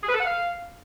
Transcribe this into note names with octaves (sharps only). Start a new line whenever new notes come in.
G#4
B4
A4
F#5
F5